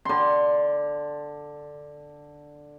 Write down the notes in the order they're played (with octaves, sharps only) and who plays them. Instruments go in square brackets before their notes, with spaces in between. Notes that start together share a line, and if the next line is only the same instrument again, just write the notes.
[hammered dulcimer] D3 C6